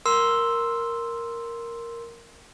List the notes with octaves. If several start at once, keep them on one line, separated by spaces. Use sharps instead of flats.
A#4 C6 E6